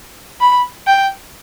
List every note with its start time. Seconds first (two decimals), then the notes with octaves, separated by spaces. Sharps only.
0.41 B5
0.87 G5